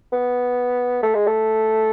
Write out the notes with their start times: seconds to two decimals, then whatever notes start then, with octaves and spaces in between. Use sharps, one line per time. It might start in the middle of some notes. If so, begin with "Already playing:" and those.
0.13 B3
1.03 A3
1.15 G#3
1.27 A3